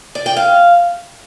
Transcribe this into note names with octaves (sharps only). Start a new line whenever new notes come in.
D5
G5
F5